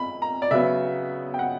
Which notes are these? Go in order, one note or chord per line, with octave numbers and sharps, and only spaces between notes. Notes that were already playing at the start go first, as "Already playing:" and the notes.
Already playing: B5
A#5
D5
C#3 F#3 B3 E5
G5
F#5